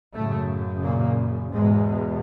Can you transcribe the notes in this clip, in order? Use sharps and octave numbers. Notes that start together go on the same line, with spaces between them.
F#2 A2 C#3 A3
A#2 A#3
E2 G#2 B2 G#3